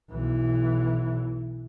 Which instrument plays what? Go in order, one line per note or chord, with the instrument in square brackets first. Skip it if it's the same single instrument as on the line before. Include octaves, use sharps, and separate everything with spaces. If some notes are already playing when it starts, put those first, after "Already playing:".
[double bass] B1 E3